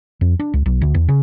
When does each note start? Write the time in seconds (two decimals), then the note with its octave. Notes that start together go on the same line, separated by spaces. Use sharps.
0.21 F2
0.39 D4
0.54 C#2
0.66 B1
0.81 D2
0.94 E2
1.08 C#3